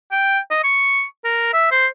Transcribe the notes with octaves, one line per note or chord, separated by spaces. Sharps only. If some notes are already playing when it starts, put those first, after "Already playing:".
G5
D#5
C#6
A#4
E5
C5